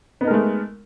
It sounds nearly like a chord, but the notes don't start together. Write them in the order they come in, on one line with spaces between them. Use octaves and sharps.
B3 D#4 A#4 G#3 A3